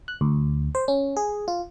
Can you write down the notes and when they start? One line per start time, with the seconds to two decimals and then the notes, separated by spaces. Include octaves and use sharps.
0.08 F#6
0.21 D2
0.75 C5
0.88 C#4
1.17 G#4
1.48 F4